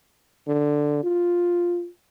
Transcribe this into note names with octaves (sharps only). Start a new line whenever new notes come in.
D3
F4